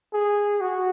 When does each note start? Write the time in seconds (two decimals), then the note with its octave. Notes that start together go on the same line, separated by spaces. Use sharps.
0.13 G#4
0.61 F#4